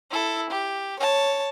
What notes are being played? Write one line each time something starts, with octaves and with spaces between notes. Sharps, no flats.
E4 A4
G4
C#5 A5